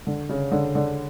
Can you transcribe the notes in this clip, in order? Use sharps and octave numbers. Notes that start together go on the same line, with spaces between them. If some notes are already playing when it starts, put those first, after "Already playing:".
D3
C#3
D3
D3